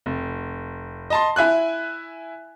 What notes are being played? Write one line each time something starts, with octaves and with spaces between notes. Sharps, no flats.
F1
D#5 A5 C6
E4 E5 G#5 F#6